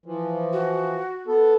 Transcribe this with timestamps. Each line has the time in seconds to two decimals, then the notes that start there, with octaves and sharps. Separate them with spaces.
0.06 E3 F3
0.53 F#4
1.27 B3 A4